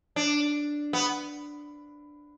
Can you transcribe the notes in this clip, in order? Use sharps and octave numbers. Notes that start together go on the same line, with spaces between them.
D4
B3